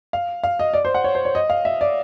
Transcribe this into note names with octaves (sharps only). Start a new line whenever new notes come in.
F5
F5
D#5
D5
C5
F#5
C#5
C5
C#5
D#5
F5
E5
D5